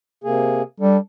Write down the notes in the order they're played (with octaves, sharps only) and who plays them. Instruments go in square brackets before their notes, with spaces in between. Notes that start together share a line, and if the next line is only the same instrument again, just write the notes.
[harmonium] C3 A#3 G#4
[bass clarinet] G3 [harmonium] D4 A4